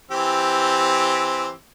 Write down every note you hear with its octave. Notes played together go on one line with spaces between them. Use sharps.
E3 C4 G4